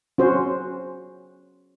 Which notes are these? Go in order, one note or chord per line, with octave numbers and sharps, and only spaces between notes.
C#4 F#4 C5